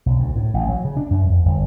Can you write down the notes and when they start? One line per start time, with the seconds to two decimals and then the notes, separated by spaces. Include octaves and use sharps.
0.06 B1
0.19 D2
0.35 A2
0.54 A1
0.69 F#3
0.85 C#3
0.97 D4
1.10 F#2
1.29 F2
1.46 G1